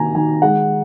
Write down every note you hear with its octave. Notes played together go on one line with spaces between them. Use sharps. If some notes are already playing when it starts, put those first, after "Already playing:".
Already playing: D#3 A#3 G#5 A#5
D#3 G#5
G#3 F#5